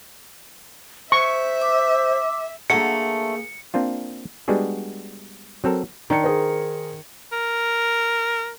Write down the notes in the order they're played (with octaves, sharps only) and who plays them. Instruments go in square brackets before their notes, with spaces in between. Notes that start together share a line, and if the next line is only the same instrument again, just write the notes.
[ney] C5 [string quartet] E5 [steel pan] C#6
[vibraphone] D6 E6
[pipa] D3 F#3 A3 [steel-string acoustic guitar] A#3 G#4 [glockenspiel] C#7
[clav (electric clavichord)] A#3 C4 D4 F4
G3 G#3 B3 D4 F#4 G#4
F#3 C4 A4 A#4
[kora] D#3 [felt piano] D4 C#7
[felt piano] G#4 A#4 C5
[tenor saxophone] A#4